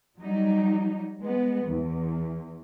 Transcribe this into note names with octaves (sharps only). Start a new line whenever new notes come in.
F#3 G3 D#4
G#3 B3
E2